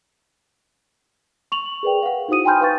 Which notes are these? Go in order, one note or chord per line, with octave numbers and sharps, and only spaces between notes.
C#6 F7 F#7
G#4 A#4 B4 D5 G5
F5 F#5
D#4 E4 F#4 C5 D#6 D#7
G5 G#5 B5 C6 F6 G6
B4 F5 C#6 A6